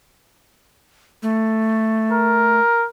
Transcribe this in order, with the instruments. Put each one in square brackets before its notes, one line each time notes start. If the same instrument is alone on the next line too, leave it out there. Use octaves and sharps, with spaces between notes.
[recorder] A3
[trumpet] A#4